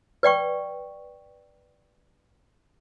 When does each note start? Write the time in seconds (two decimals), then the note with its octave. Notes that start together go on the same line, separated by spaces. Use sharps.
0.23 B4 D5 G5 C#6